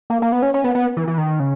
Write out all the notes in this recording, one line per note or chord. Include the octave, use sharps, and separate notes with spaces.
A#3
A#3
B3
C#4
C#4
B3
B3
E3
E3
D#3
C#3